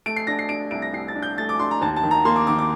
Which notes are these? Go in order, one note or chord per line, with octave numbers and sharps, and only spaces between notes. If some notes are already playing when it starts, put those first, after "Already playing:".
A3 D7
C7
D4 A#6
C7
D4 D7
C2 D7
A#6
C2 C7
A6
D4
G6
A3 A6
D6
D4 C6
A#5
D#2 A5
A5
D#3
A#5
A#3 C6
D6
D#3 D6
D6